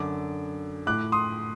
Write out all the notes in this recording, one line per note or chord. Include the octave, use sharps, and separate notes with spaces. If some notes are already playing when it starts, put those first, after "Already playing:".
Already playing: F#2 D3 D6
A2 D6 F#6
C6 D#6